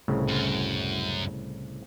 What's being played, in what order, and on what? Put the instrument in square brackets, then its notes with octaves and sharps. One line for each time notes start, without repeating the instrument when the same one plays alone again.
[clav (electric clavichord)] C2 A2 C#3
[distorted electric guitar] F#2